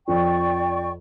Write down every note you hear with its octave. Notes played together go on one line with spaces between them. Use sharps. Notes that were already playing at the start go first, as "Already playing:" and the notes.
F2 D5 G5 C#6